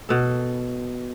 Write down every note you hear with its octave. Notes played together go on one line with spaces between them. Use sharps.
B2 A4